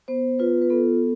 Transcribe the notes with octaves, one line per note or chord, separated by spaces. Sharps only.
B3 C5
F4 B4
B4
B3 A4